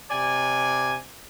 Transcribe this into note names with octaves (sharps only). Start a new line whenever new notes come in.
C3 D5 G#5